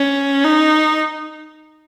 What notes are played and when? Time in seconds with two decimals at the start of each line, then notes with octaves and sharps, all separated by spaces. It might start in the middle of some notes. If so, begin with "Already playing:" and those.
Already playing: C#4
0.44 D#4